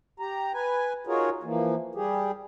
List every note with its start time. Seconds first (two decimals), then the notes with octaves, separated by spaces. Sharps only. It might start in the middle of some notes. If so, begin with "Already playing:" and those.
0.20 G4 A#5
0.54 B4 G#5
1.07 D#4 F4 F#4 G#4 A#4 C#5
1.43 E3 F3 A#3
1.95 G3 G4 G#4